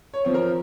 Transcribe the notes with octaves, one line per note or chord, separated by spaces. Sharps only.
C#5
F3 C4
A#4